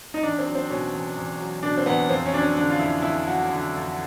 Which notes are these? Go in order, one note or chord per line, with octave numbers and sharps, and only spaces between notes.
D#4
E2 D4
C4
F#3
C4
B2 C#4
E2
E2
F#3
B2 D4
C4
E2 B3
F2 C4
C#4
F#3 D4
C#4
D3 D4
F4
F2 E4
F2 E4
F#3 F#4
D3
F2